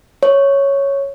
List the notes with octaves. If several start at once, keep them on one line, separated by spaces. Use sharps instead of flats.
C#5